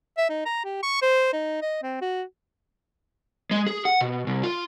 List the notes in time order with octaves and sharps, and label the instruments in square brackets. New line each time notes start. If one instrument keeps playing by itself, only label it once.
[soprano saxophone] E5
D#4
A#5
G4
C#6
C5
D#4
D#5
C4
F#4
[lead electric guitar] G#3
G#4
F#5
B2
C2
F4